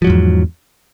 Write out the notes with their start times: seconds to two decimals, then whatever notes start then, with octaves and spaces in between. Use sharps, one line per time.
0.02 F3
0.04 F#3
0.07 G#2
0.10 E2